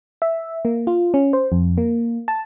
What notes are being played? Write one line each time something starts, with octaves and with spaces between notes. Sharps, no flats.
E5
A#3
F4
C#4
C5
F2
A#3
A5